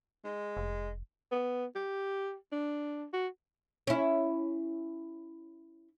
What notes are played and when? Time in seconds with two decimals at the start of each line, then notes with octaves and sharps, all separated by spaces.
0.25 G#3
0.57 F1
1.31 B3
1.76 G4
2.52 D4
3.13 F#4
3.87 C#4 E4